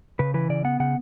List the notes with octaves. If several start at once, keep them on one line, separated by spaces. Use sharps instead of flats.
C#3 B4
E3 B4
C#3 D5
B3 F#5
C#3 F#5